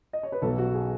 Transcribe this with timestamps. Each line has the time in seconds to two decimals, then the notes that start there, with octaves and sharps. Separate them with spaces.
0.13 D#5
0.23 C#5
0.32 B4
0.42 B1 B2 F#3 A4
0.58 F#4
0.74 G#4